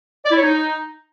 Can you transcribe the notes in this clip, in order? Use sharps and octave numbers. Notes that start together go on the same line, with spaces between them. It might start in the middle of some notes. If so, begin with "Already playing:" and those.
D5
E4
C#5
D#4